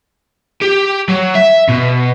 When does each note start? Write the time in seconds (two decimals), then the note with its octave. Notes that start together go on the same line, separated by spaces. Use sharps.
0.62 G4
1.09 F#3
1.35 E5
1.69 B2